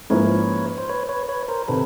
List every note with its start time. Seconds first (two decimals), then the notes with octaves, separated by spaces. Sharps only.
0.10 G#2 F3 A#3 C#4 E4 B4 C#5
0.78 C5
0.89 B4 C#5
1.09 B4 C#5
1.29 B4 C#5
1.48 A#4 C5
1.68 C3 D#3 A4 B4